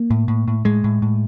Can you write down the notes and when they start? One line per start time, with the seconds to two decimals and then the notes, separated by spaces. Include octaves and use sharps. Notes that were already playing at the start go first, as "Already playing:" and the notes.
Already playing: A#3
0.10 A2
0.28 A2
0.48 A2
0.65 A2 G#3
0.84 A2
1.02 A2